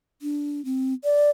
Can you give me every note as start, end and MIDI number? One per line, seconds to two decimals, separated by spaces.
0.22 0.63 62
0.65 0.94 60
1.04 1.30 74